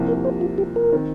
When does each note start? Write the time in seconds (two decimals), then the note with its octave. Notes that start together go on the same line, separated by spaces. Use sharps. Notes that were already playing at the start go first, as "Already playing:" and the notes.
Already playing: C2 C3 F3 A#3
0.08 A#4
0.25 C5
0.41 F4
0.58 G4
0.76 A#4
0.92 D#3 C4